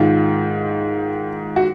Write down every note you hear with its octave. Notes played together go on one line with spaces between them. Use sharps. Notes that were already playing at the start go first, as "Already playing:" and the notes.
Already playing: G#2 D#3 F4
F#4